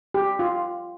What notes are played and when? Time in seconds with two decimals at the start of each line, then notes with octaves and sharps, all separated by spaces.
0.14 G4
0.39 F4